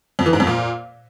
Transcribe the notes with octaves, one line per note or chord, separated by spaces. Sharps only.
F2
E3
G#2
F2
A#2